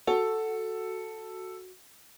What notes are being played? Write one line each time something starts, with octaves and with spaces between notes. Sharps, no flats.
F#4 A4